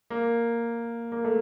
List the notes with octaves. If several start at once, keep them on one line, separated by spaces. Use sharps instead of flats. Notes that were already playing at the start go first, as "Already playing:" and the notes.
A#3
A#3
A3